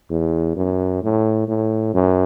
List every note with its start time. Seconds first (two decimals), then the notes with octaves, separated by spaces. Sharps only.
0.10 E2
0.56 F#2
1.02 A2
1.48 A2
1.94 F#2